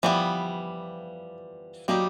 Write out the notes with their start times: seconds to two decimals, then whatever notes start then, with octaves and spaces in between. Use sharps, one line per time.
0.03 E3 F3 G3 B3
1.88 F#3 G3 A#3 D#4 G4